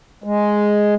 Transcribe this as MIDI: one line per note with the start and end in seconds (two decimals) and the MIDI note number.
0.24 0.95 56